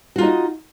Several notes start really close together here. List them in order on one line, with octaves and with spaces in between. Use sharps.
F#4 F4 D#4 D#5